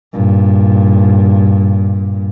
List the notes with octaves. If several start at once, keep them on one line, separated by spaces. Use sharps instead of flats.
G2 A#2